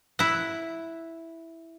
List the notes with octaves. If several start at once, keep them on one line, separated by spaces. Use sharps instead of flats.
E4 F#5